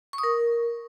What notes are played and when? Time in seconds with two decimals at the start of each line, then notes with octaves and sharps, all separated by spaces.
0.13 C#6
0.18 D#6
0.23 A#4